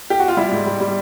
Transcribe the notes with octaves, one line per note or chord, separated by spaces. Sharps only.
G4
F#4
F4
G3 E4
G#2
G3
G3